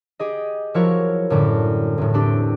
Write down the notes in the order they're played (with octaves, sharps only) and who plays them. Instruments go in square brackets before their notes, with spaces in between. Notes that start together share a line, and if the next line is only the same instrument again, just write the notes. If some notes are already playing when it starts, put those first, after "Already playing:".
[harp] G4 G#4 D#5
F3 F#3 E4 F#4 A#4 C#5
F#2 A2 D3 G3
E2 A2
C4 D4 G4